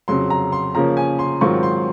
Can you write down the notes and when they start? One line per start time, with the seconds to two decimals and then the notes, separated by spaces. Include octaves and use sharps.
0.08 F2 C#3 F#3 C6
0.30 A#5
0.52 C6
0.75 C#3 F3 A#3 C#4 A#5
0.97 G#5
1.19 C6
1.41 G#2 D#3 F#3 C4 F4 C#6
1.63 C6